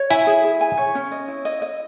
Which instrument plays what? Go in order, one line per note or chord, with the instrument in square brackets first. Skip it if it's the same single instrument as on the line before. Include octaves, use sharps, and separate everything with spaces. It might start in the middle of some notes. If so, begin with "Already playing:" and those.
Already playing: [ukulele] C#5
[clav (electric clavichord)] E4 [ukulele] G#5
[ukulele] G#4
G#4
G#5
C#5
C#4
D#5
E4
D#5
D#5